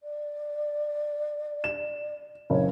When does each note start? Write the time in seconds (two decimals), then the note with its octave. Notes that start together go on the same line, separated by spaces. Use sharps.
0.01 D5
1.64 E7
2.50 F#1 C#3 C#5